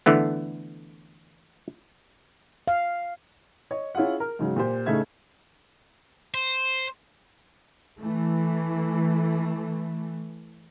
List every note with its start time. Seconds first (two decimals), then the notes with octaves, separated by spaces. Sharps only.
0.06 D3 E3 A3 B3
2.68 F5
3.71 C#5 D#5
3.95 C#4 E4 F4 G#4 F#5
4.20 A#4
4.39 G#2 C#3 F#3
4.56 A#2 G4 C5
4.86 A2 C#3 A3 D#4 E5 G#6
6.35 C5
7.97 E3 A3